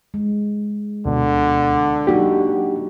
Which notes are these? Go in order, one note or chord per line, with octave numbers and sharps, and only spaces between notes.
G#3
D2 B2 D3
F#3 A#3 D4 D#4 F#4 G4